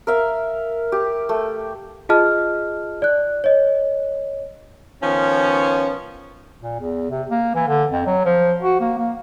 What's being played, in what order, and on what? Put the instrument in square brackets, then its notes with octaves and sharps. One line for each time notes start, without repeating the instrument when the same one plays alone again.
[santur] A#4 E5 F5
G4
A3
[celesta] F4 G#4 D#5 A5 F6
D5 F#6
C#5 D#5
[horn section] D#3 F3 B3 C#4
[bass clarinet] A#2
E2
C3
A#3
E3
D3
F2
F#3
F3
F#4
A#3
A#3